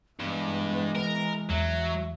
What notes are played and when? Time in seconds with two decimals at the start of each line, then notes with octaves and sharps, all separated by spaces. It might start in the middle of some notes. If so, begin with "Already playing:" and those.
0.20 G2 E3 G#3 B3
0.96 A#4
1.50 E2 F#3 E5